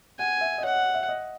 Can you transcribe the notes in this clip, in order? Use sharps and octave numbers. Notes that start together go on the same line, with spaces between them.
F#5 G#5
E5
D#5
C#5 F#5
E5
D#5